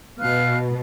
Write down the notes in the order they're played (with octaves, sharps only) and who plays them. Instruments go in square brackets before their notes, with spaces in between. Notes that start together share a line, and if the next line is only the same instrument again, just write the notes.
[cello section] B2 [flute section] F5 F6 F#6